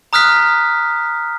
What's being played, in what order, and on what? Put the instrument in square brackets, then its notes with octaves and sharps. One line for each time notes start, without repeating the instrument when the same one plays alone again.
[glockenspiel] A#5 D#6 F6 F#6 B6